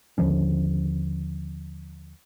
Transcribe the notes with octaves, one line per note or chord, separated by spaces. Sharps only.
D#2 D3 F3 C#4